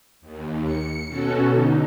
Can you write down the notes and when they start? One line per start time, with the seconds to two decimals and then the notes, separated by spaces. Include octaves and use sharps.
0.21 D#2
0.64 C#7
1.07 B2 C#4 F#4 A4
1.45 D3 D#4